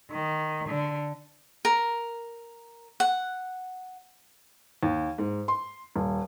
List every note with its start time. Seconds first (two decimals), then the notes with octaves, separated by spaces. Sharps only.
0.11 D#3
0.68 D3
1.65 A#4
3.00 F#5
4.83 D#2
5.18 G#2
5.48 C6
5.96 D#1